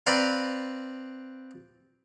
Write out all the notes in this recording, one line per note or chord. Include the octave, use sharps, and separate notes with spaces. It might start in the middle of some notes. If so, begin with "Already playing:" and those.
C4 B4 D5 F5 A#5 B5